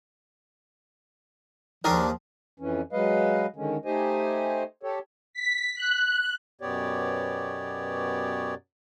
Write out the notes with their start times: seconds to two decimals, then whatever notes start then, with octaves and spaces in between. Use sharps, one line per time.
1.84 D#2 D#3 F3 C#4 D4 G#4 A#4
2.60 F2 E3 C#4
2.93 F#3 G#3 B4 D#5 F5
3.56 D3 D#3 G#3 C#4
3.85 A3 D#4 G4 C5 D#5 G#5
4.83 G4 A4 C#5
5.33 B6
5.75 F#6
6.61 F#2 B2 B3 G4 C#5 D5